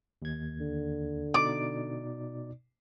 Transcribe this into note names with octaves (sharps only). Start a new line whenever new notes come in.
D#2 G#6
D3
B2 D#4 D5 D6